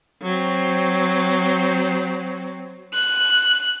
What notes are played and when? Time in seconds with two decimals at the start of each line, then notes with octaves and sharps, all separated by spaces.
0.22 F#3 C4
2.94 F#6